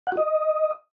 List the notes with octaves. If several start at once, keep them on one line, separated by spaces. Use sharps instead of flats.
F#5
F#4
D#5